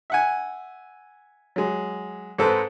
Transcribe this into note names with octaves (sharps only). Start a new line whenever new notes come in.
E5 F#5 G#5
F#3 G#3
G#2 G#3 C4 A4 B4